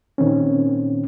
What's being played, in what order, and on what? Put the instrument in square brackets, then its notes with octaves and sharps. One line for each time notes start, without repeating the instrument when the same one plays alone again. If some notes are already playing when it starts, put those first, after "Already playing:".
[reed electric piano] A#2 D#3 C4 C#4